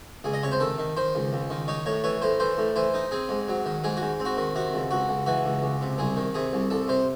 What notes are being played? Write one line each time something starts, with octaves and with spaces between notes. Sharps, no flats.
C#2 G#4
D#5
C3 C#5
C5
D#3 A4
D#3
D#3 C5
C#2
C#2
D#3
D#4 C#5
A2 C#5
E3 C#5
A2 C5
E3 C5
A2
E3 C5
D#4
C4 G#4
G#2
F#3
D#3
G#2 G#4
G#2 F#4
C4
F#4
D#3
C3 F#4
C#2
C#2 F#4
C#2
E3 F#4
C#2
C#2
C3
C2 G#4
D#3
C3 G#4
C2
C2 A4
C3 C5